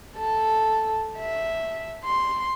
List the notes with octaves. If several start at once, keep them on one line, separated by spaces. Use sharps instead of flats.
A4
E5
C6